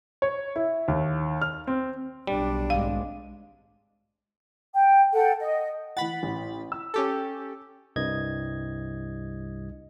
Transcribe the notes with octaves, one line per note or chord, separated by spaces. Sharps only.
C#5
E4
D#2
F6
C4
B1 G3 D4
G#1 G#3 F5
G5
A4 F#5 G5
D#5
E3 F#5 B5 A6
A1
E6
C#4 G4 A4
C2 G2 D#5 G#6